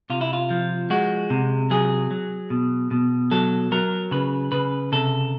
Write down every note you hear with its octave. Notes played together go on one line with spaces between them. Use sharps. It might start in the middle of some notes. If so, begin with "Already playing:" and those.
C3 F4
E4
F4
F3
G#3 F#4
C3
F#3 G#4
F#3
B2
B2
F#3 A4
F#3 A#4
C#3 B4
C#3 B4
C3 A4